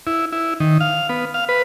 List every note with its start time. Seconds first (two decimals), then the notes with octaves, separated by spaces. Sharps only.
0.07 E4
0.32 E4
0.60 D#3
0.80 F5
1.09 B3
1.34 F5
1.49 B4